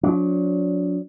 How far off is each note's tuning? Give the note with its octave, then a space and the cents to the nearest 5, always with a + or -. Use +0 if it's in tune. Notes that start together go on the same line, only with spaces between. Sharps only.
F#3 -40 D4 -35